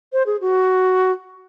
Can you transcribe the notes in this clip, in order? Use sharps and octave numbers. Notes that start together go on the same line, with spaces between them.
C5
G#4
F#4